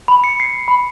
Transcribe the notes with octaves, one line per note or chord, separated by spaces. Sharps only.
B5
C#7
C7
B5